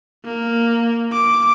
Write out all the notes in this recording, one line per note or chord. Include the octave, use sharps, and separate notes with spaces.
A#3
D6